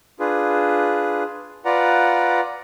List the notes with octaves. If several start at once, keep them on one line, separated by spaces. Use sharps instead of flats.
D4 F4 G#4 B4
F4 B4 D5 F#5 A#5